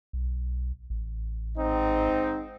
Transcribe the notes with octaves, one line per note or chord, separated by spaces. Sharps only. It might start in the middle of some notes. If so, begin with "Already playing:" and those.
B1
A1
G#2 C4 D#4